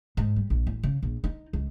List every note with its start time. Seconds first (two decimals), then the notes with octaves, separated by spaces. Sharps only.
0.17 G#2
0.36 G3
0.50 A#1
0.67 A1
0.83 C#3
1.02 A#1
1.24 D#4
1.53 C#2